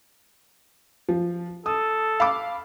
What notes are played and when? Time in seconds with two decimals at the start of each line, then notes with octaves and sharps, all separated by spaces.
1.09 F3
1.66 A4 D#6
2.20 F5 B5 D6